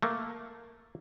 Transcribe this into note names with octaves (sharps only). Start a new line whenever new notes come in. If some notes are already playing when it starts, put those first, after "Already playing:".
A3 A#3